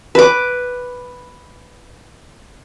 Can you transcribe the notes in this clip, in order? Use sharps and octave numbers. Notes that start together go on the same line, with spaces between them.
B4 D6